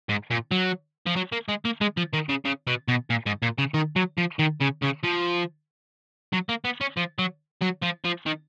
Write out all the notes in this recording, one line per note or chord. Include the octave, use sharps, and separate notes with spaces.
G#2
A#2
F#3
F3
F#3
A#3
G#3
A#3
G#3
F3
D#3
C#3
C#3
B2
B2
A#2
G#2
A#2
C#3
D#3
F#3
F3
D#3
C#3
C#3
F3
F#3
A#3
B3
C#4
F3
F#3
F#3
F3
F3
D#3